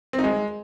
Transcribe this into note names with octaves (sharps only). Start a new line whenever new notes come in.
C4
D#4
G#3